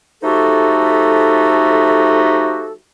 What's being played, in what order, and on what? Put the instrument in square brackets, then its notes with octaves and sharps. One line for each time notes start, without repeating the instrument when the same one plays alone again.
[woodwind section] F3 A3 D#4 F#4 G4 A4